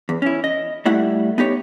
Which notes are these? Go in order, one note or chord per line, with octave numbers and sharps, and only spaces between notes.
E2
C#4 E4
D#5
G3 A3 E4 F#5
B3 D#4 G4 C#5